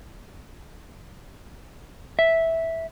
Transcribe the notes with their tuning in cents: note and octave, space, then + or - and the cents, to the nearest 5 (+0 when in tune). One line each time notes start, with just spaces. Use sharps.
E5 -5